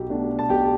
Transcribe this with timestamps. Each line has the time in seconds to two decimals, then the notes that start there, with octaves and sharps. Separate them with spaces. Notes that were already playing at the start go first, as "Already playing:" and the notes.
Already playing: B1 G4
0.09 B2 A3 D4
0.39 A5
0.49 B1 G4 G5